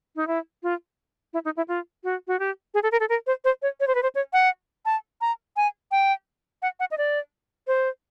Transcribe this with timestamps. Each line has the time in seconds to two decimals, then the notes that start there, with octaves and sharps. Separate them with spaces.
0.16 D#4
0.27 E4
0.63 F4
1.33 E4
1.45 D#4
1.57 E4
1.68 F4
2.04 F#4
2.28 F#4
2.39 G4
2.74 G#4
2.83 A4
2.92 A#4
3.00 A4
3.09 A#4
3.27 C5
3.45 C5
3.62 C#5
3.80 C#5
3.88 C5
3.95 B4
4.03 C5
4.15 C#5
4.33 F#5
4.85 A5
5.21 A#5
5.57 G#5
5.91 G5
6.62 F#5
6.80 F#5
6.91 D#5
6.98 D5
7.67 C5